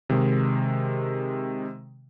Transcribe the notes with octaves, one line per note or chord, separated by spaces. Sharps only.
C3 D#3 G#3